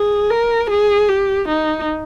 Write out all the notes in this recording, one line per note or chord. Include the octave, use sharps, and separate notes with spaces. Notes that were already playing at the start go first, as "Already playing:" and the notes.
Already playing: G#4
A#4
G#4
G4
D#4